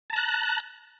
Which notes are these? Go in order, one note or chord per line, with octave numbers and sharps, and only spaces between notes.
A5 A#5 F#6